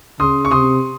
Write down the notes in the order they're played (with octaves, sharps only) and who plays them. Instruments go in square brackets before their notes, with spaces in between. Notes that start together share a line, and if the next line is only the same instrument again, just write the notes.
[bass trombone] C#3 [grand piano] C6 D#6
[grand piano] C#6
[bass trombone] C3 [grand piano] C6 D#6